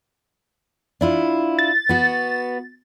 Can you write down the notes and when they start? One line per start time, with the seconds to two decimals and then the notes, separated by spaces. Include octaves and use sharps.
1.01 D4 E4 F4
1.59 A6
1.89 B3 F#4